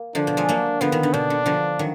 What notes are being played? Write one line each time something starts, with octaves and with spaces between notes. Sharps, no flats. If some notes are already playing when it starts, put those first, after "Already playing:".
Already playing: A#3
D3 F3 D4
B2
F3 G#3
F#3 A#3
D3 F3 B3
D#3
D3
B2 D4
D3
D3 F3
D#3 F#3